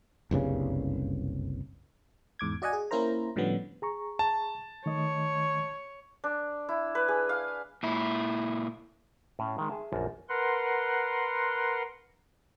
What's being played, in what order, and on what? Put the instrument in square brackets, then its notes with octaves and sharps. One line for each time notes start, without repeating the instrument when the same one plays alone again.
[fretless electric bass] F#1 C2 G2 C#3
[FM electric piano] E2 G#2 D6 G#6
F#4 D5 D#5 F#5 G#5
G#4
A#3 C#4 E4 A#4 C5 A#5
A2 D3 F3 G3 B3 C#4
[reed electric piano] G#4 A#5 C#6
[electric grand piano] A5
[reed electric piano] D#3 A3 D#5 [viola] C#5
[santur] D4
E4
B4
G#4
F5
[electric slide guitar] A#2 E4
[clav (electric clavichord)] A2 C#4
D#3 G#3
G#4 E5 A5
A#1 F#2 A#4 A5
[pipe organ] A#4 B4 F#5 C6